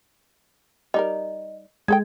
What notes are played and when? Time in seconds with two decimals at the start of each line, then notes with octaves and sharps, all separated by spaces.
0.94 G3 D#4 A#4 D#5
1.88 G#3 G#4 A4 G5 G#6